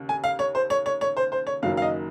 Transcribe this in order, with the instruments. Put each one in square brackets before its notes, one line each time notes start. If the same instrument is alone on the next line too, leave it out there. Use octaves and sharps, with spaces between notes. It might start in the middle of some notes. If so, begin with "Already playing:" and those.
Already playing: [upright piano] D#2 C#3
G#5
F5
C#5
C5
C#5
C#5
C#5
C5
C5
C#5
F#1 F#2 D#3 F#3 F5
F5
D#5